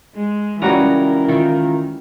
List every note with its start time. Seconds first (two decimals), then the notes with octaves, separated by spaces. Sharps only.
0.15 G#3
0.62 C#2 E3 G3 C#4 F#4 A#4 A#5
1.28 D#3 E4 F4